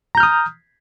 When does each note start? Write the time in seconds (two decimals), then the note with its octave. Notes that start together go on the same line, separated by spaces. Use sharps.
0.15 A#5
0.17 G6
0.20 F6
0.23 D#6